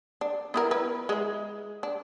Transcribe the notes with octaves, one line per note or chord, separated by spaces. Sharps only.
D4
B3 E4 A#4
E4 B4
G#3 E4
D4